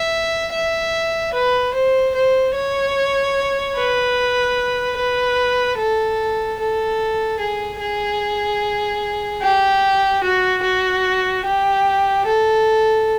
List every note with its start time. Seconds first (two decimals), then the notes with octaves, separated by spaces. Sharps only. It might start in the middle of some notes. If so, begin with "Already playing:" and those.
Already playing: E5
0.52 E5
1.33 B4
1.74 C5
2.15 C5
2.54 C#5
3.76 B4
4.97 B4
5.78 A4
6.59 A4
7.40 G#4
7.80 G#4
9.42 G4
10.23 F#4
10.63 F#4
11.45 G4
12.25 A4